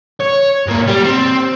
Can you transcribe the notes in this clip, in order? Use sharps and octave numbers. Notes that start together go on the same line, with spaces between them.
C#5
G#2 A#3
G3
C4